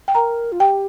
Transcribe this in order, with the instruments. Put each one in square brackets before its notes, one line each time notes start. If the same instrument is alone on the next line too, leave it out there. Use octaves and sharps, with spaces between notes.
[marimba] G5
[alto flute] A#4 [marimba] A#5
[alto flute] F4
[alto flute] G4 [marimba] G5